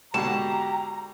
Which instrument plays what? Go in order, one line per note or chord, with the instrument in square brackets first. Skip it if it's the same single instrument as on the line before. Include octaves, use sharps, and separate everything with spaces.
[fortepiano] G#2 B2 D3 [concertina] G4 [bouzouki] A5 [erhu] A#5